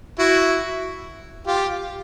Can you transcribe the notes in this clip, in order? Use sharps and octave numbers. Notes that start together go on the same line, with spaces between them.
E4 F#4
F4 G4